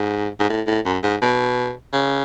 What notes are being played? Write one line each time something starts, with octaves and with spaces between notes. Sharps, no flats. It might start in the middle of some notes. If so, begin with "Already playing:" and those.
Already playing: G#2
G#2
A2
A2
F#2
G#2
B2
C#3